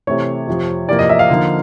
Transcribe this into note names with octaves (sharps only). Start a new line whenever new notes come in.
C3 E3 A3 C4 C#5
F2 C3 F3
E2 C3 F3 A#3 D5
D#5
E5
F5
D3 F3 A#3 D#4